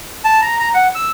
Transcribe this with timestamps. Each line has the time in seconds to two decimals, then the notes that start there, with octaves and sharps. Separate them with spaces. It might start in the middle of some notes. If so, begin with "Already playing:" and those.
0.24 A5
0.42 A#5
0.59 A#5
0.74 F#5
0.95 E6